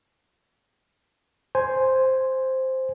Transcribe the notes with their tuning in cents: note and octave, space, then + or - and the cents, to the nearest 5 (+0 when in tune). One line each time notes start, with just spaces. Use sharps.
C5 +0 G#5 +0